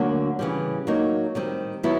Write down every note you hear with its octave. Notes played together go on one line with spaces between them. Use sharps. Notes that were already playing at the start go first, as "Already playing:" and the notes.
Already playing: D2 D3 F#3 A#3 D4
C#3 E3 G3
F#3 A#3 D#4
D#3 G3 C4
D#3 F#3 B3 E4